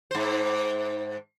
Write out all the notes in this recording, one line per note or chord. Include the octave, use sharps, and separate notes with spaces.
G#2 C5